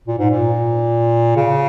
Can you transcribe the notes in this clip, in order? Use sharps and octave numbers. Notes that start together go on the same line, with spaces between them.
A#2
G#2
A#2
C#3